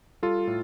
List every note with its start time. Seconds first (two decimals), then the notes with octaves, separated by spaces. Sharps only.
0.22 G3 F4 A4
0.47 A2